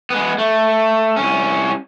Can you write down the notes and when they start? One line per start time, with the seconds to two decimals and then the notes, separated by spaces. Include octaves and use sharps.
0.10 G#3 B3
0.38 A3
1.16 C2 C#4